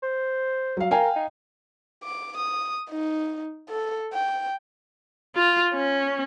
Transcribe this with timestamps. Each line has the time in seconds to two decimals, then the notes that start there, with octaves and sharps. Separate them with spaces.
0.03 C5
0.77 F#3 F5
0.91 A#4 F5 G5 G#5
1.16 D#4
2.03 D6
2.37 D#6
2.90 D#4
3.69 A4
4.13 G5
5.36 F4
5.74 C#4